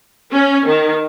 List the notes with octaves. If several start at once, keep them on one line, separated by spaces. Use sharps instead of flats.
C#4
D#3